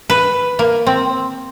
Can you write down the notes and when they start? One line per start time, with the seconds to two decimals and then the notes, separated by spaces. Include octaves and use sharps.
0.10 B4
0.59 A#3
0.87 C4